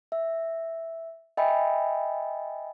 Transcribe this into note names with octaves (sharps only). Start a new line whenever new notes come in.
E5
D#5 E5 G5 G#5 B5